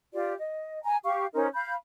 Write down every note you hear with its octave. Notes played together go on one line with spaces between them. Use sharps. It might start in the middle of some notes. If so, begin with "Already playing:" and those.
F4 G4 D5
D#5
G#5 A#5
G4 F5 C#6
C#4 D#4 A#4 C5
F5 B5 G6